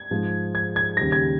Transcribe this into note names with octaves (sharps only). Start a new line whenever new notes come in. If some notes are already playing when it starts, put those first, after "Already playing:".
Already playing: G#6
G#2 F3 G#3
G#6
G#6
D#2 C#3 G3 A#6
G#6